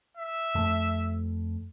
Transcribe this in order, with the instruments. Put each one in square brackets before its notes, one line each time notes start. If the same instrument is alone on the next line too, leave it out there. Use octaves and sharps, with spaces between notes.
[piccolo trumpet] E5
[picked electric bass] F2 A3